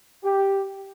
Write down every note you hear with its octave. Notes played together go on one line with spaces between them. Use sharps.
G4